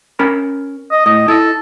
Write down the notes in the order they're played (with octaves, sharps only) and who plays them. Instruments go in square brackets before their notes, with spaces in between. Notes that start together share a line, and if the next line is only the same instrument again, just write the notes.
[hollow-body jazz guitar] C#4 A#4 B5
[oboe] D#5
[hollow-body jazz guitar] A2 [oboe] D#5
[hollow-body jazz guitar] E4 D#5 [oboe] A4